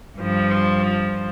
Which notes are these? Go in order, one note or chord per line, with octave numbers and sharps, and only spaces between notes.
G2 F3